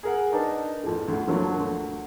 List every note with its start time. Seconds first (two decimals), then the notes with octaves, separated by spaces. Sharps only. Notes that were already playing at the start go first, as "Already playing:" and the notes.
0.03 G#4 A#4 F#5
0.32 D4 D#4 A#4 B4 A5
0.83 F2 A2
1.08 D2 A2
1.27 G2 D3 F3 F#3 A#3
1.60 D2